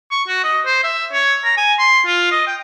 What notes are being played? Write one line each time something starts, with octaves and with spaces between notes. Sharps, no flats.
C#6
F#4
D#5
C5
E5
C#5
A#5
G#5
C6
F4
D#5
G5